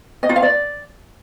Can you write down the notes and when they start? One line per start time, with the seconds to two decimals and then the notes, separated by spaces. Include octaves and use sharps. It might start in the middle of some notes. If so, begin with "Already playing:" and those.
0.23 D#5
0.29 F4
0.36 F5
0.42 D5